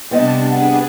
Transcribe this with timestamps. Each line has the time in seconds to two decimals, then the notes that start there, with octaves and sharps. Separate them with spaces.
0.11 C3 G3 B3 D4 D#5 A5
0.51 D4 G#4 B4 F#5